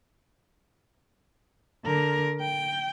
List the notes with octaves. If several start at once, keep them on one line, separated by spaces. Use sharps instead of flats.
D3 A#4
G5